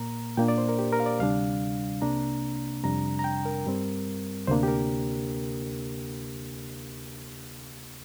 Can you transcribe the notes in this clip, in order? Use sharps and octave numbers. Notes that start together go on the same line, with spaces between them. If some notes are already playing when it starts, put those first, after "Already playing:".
Already playing: A#2 A#3 A#5
A#2 A#3 D4 G5
D5
C5
A#4
G4
A#4
F5
D5
D2 C3 G3 D4 F5
C2 C3 A#3 D4 A#5
F2 C3 G3 D4 A#5
A#5
G5
A#4
G2 G3 C4
D2 C3 A#3 D4 C5
G4
A#4